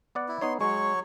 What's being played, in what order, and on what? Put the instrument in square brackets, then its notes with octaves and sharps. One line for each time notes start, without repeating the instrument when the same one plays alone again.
[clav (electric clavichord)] B3 D5 F#5
[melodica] E4
[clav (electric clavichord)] B3 D#4 C#5 [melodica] C6
[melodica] F#3 C#5 C#6 [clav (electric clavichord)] G#3